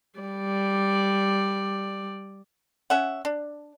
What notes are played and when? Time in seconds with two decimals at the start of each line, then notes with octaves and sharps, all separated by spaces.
0.20 G3 D5
2.90 C#4 E5 F#5
3.25 D4